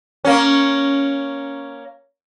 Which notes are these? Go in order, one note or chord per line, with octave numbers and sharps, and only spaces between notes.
A#3 C#4